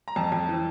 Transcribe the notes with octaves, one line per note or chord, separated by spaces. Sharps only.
A#5
F2 A5
F2
E3